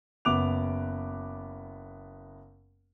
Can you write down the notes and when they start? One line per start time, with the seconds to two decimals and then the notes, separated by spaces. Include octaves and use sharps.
0.25 F#1 B3 D6 F#6 F7